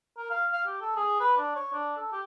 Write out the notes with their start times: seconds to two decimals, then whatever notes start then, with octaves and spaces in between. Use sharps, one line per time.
0.17 A#4
0.30 F5
0.52 F5
0.66 G4
0.81 A4
0.96 G#4
1.20 B4
1.37 D4
1.55 C#5
1.73 D4
1.97 A4
2.12 G4